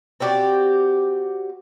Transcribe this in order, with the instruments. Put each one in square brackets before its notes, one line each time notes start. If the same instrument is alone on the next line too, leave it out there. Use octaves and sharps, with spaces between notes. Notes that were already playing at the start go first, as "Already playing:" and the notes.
[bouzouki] C4 F#4 G4 D5